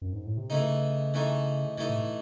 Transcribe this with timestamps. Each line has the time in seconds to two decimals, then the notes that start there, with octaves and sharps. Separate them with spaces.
0.02 F#2
0.13 G#2
0.25 A2
0.37 C3
0.50 C#3 E3 A3 D#4
1.14 E3 A3 D#4
1.78 C3 E3 A3 D#4
1.89 A2